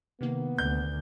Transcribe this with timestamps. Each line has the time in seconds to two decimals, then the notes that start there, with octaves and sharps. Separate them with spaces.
0.21 C3 D#3 A#3 B3
0.58 D2 G6